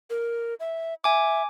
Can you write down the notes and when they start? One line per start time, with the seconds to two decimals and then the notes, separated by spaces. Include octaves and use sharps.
0.10 A#4
0.60 E5
1.04 E5 G#5 D6